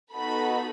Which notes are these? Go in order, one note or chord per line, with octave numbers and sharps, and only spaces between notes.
B3 D#4 F#4 A4 B5